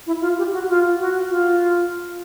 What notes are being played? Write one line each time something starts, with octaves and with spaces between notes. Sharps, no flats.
E4
F4
G4
F#4
F4
F#4
F4